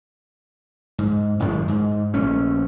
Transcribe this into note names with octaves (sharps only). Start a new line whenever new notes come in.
G#2
A1 F#2 D#3 G#3
G#2
A#1 A3 C#4